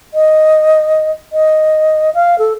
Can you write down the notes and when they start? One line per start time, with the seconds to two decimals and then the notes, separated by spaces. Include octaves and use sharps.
0.14 D#5
1.32 D#5
2.14 F5
2.39 A4